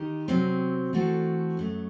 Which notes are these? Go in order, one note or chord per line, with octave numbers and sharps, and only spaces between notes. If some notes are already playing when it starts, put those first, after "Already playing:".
Already playing: D#3 D#4 G4
C3 F#3 C4
E3 A3 C4 F#4 A4
F#2 F#3 A3